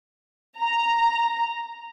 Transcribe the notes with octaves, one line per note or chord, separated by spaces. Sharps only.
A#5